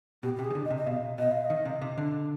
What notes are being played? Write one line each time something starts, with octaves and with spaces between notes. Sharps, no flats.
B2 G4
C3 G4
G#4
D#3
D3
D#5
C3
D#5
B2 F5
B2 D#5
F5
D#5
D#3
C3
C3
D3